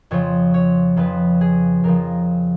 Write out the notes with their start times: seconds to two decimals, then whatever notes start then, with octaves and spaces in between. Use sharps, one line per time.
0.11 F2 C#3 F3 C#5
0.54 C#5
0.96 F2 C#3 F3 B4
1.41 G#4
1.83 F2 C#3 F3 A#4